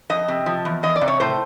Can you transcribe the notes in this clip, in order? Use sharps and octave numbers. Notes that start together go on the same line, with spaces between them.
F2 D#5
C3
F3
E2
E2 D#5
D5
C3
C#5
A2 C5